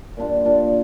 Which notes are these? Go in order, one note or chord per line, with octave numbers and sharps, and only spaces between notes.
A#2 G3 D4 F4
A#2 G3 D4 F4